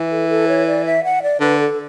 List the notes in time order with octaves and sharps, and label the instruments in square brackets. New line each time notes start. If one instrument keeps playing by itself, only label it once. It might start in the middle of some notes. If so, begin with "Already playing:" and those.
Already playing: [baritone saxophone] E3
[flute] A4
A4
C#5
D5
E5
F#5
D5
[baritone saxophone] D3 [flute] B4
[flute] A4